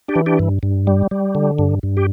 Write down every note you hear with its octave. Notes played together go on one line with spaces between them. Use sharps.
D4 G4
E3
D4 G4
G2
G2
G3
G3
D3
G2
G2
G4